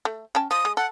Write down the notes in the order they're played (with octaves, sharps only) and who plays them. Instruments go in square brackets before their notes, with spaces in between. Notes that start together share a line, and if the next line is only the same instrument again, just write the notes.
[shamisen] A3
C#4 G5 A5
[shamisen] F3 [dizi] D#6
[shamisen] G#3
[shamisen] A4 [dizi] F#5